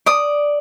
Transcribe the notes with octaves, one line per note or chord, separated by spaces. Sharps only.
D5 D#6